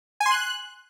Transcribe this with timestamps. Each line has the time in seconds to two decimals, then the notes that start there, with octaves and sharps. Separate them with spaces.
0.20 G#5
0.26 C6
0.31 F#6